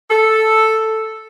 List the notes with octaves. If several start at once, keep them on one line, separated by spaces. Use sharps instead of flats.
A4